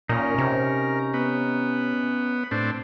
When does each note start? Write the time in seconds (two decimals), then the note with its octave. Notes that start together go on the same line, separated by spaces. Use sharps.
0.09 A#2 C#4 D#4 A#4
0.38 C3
1.14 B3
2.51 A2 C4 D4